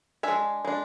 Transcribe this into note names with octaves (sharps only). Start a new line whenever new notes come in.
G#3 D4 E5 G#5
G#3 D4